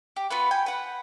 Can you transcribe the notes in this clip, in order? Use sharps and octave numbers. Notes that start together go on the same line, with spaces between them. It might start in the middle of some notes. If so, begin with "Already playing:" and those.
G4
B3 F4 F#4 B4
G5 G#5
B4 F#5